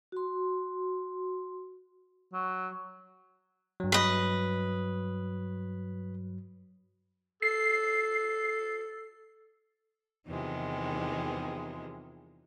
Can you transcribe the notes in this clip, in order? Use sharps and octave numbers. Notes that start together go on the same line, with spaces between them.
F#4 C6
F#3
G2 F#3
B4 D#5
A4 C7
E2 C3 D#3 F3 G3 G#3